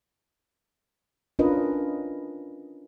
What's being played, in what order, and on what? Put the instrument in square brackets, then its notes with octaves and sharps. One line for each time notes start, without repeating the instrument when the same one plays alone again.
[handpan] C#4 D4 F4 A#4 B4 D#5